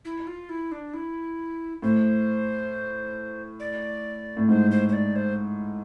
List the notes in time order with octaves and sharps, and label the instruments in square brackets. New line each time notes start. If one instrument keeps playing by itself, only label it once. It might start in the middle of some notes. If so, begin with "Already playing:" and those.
[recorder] E4
F4
E4
D4
E4
[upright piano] A2 [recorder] C5
[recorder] D5
[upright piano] A2
[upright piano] G#2 [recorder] C5
[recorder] C5
C5
D5
C5